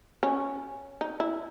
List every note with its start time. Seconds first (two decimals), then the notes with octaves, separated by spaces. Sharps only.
0.23 C#4
1.01 D#4
1.20 E4